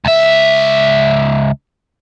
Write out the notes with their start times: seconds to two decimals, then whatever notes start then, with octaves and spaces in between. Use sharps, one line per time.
0.05 C#2 E5